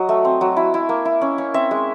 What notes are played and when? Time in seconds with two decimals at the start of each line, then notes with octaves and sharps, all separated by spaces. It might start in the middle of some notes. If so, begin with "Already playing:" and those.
Already playing: F#3 D#5
0.09 A3
0.25 C4
0.41 F#3
0.56 E4
0.74 E4
0.89 A#3
1.05 E4
1.21 C#4
1.38 C#4
1.54 C4 E5
1.71 G#3